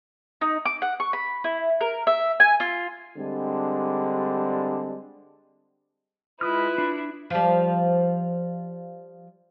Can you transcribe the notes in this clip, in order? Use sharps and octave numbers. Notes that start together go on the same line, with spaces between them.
D#4
D6
F#5
C#6
B5
E4
A#4
E5
G#5
F4
D3 G3 G#3 C4 D4
G#3 E4 F4 B4 D#6 F6
D4
F3 G3